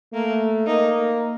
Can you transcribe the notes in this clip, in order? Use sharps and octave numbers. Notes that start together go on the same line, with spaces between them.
A3 A#3
A#3 D#4